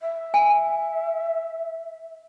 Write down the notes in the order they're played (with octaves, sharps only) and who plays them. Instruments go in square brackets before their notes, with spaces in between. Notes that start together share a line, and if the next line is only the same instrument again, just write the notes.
[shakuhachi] E5
[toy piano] G#5